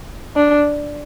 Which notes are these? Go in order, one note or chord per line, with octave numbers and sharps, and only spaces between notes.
D4